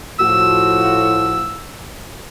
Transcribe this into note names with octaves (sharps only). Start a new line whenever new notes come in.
A2 F3 F#4 E6